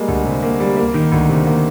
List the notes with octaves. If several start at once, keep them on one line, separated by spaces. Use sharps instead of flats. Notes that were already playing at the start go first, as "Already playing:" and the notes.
Already playing: G3 G#3 A#3
D2
C3
A#3
G3
A#3
D#3
D2
C3
A#3